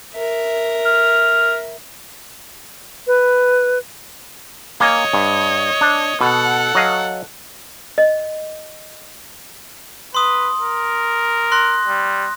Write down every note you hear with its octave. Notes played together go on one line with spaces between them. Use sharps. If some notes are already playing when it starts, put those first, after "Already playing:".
A#4 E5
F6
B4
A#3 C#5 D#5 G#5
G2
D4
B2 A4 F#5
F#3 D#5 F5
D#5
B4 C6 D#6
A#4
C6 F#6 A#6
G3